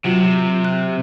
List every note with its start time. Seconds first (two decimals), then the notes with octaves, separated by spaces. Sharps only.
0.05 C3 F#3 F4 F#4
0.65 F#6